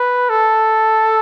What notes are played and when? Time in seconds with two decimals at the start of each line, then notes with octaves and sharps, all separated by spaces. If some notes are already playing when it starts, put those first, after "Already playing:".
Already playing: B4
0.30 A4